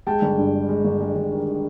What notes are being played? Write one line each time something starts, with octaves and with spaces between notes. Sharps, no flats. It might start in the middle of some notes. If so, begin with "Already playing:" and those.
G#3 G5 A5
G1
G2
G#3
G#3
G1
G#3
G1
D#3
D#3